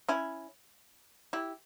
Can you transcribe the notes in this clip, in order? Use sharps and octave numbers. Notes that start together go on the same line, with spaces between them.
C#4 E4
E4 G4